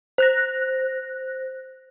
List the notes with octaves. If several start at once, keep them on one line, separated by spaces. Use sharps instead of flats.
C5 F#6 A#6